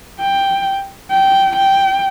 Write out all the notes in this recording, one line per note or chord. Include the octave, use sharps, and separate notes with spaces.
G5
G5
G5